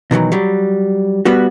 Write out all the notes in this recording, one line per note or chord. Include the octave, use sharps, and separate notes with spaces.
B2 D#3 E3 F#3
F#3 G3
G3 B3 F#4